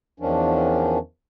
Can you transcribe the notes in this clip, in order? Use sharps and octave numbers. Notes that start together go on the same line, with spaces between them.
E2 D#3 F3 C#4 D4